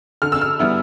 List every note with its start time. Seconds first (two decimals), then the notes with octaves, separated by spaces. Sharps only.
0.22 D3 F6
0.32 E6
0.41 F6
0.59 G3 B3 E4